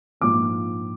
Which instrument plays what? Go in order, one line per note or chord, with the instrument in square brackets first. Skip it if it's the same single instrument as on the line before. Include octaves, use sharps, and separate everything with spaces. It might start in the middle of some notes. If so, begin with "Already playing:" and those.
[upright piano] A#1 G#2 F3 A#3 D6